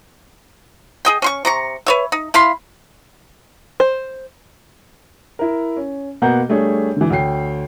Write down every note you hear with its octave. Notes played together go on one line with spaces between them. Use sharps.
G#4 D#5 G5
C#4 C6 C#6
C3 A#5 C#6
B4 C#5 E5
D#4
E4 F5 B5 C6
C5
E4 A#4
C#4
B2 A#3 B3 F#5 A#5 G6
G3 A3 D4 G#4 C#5
D3 E3
D2 C#5 G5 C7